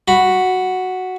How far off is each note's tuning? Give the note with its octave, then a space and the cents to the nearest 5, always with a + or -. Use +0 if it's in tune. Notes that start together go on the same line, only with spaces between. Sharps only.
F#4 +0 B5 +0